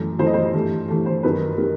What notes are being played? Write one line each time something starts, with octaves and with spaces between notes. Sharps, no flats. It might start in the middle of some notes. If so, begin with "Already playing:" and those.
Already playing: F#2 E3 A3
F#2 E3 A3 C5
D#5
C5
G2 E3 A3
G2 E3 A3
C5
F#2 D#3 G3 B4
D#3 G3